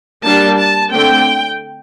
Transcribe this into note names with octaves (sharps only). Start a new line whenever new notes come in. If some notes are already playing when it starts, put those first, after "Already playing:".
G3 A#3 D4 A5
A5
D3 A3 C4 G5